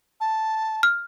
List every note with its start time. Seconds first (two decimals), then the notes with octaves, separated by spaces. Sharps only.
0.21 A5
0.83 F6